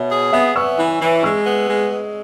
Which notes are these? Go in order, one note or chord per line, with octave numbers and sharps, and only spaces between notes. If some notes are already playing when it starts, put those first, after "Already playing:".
Already playing: B2 C#5 E5
G#4
B3 E5 G#5
B3 C#6 E6
E3
E3
G#3 C#6 E6
B3
G#3
G#3